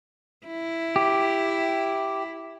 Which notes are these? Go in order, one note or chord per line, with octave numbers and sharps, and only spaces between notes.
E4
G4